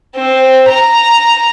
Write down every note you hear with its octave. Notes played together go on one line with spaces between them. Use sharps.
C4
A#5